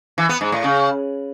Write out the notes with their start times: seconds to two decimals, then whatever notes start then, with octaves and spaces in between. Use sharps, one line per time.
0.18 E3
0.29 B3
0.41 G#2
0.52 A2
0.64 C#3